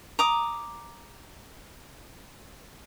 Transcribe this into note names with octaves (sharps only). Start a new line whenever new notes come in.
A#5 D6 D#6